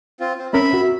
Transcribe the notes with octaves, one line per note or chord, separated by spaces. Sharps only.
C4 F4
C4
C4 C#4 A#4 E5 B5
F#4